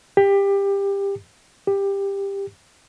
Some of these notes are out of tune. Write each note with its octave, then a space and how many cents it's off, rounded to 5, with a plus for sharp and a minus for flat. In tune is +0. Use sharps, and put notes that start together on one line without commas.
G4 +20
G4 +15